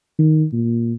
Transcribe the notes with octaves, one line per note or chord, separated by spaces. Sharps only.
D#3
A#2